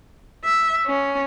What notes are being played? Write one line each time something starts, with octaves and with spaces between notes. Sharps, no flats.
E5
C#4